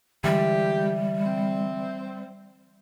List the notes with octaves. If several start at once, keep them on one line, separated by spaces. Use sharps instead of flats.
D3 E3 G3 G#3 G4 E5
C4